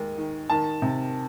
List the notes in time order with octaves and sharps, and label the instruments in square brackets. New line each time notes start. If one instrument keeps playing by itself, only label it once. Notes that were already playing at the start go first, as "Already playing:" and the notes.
Already playing: [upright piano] D#2 G#3
D#3
D#3 A5
C3